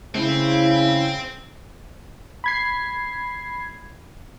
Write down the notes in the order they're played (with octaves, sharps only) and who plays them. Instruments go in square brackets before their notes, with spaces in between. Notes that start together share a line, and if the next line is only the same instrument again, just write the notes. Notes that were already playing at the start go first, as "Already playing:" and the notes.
[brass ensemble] C#3 [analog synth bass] A3 [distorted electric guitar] C4 [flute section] E4
[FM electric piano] B5 G#6 C7